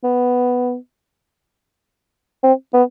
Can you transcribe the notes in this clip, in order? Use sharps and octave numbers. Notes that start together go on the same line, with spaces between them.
B3
C4
B3